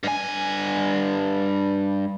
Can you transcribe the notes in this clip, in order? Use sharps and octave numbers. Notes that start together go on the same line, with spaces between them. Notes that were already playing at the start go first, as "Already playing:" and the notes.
G2 G#5